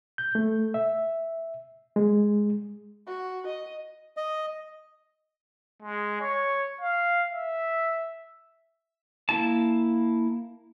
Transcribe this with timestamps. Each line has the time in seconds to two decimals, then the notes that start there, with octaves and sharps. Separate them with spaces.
0.18 G6
0.35 A3
0.74 E5
1.96 G#3
3.07 F#4
3.46 D#5
4.17 D#5
5.83 G#3
6.21 C#5
6.81 F5
7.31 E5
9.29 A#3 E4 A5